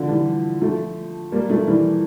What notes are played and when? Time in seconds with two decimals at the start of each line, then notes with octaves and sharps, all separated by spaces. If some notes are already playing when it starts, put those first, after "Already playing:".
Already playing: D3 F3
0.09 E3 G3
0.62 F3 A3
1.32 G3 A#3
1.50 F3 A3
1.67 E3 G3